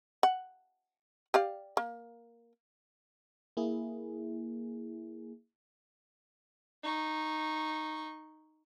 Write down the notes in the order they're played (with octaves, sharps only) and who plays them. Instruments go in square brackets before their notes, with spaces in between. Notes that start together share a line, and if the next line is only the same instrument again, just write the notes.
[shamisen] F#5
G4 D5 F5
A#3
[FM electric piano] A#3 E4 G#4
[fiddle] D#4 C#6